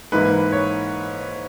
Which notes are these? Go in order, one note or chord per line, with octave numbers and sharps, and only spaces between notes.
G#2 E3 A#3 B4
C#5